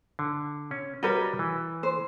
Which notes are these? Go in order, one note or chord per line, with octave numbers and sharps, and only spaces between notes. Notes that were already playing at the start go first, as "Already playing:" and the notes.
D3
C#4
G3 F#4 A#4 B4 C#5 D#5
E3
C5